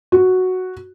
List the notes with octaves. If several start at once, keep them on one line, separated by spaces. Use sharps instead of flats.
F#4